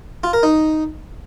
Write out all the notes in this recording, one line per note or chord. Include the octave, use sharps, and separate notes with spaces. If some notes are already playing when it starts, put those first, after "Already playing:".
F4
A#4
D#4